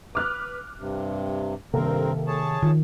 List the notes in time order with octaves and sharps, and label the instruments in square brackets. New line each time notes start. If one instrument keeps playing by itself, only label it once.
[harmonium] B4 [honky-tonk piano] D6 F6 F#6
[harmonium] G2 C3
[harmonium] G2 C4 A#4 [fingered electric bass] C3 D#3 [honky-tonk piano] A#3 A4 F5
[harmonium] G#4 C#5 A5
[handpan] D#3 [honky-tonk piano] F3